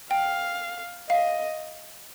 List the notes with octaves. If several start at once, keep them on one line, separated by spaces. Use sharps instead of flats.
F5 G5
D#5 F5